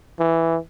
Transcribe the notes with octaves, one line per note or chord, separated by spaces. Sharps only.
E3